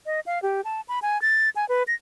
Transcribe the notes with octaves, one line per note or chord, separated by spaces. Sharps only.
D#5
F5
G4
A5
B5
G#5
A6
G#5
B4
A#6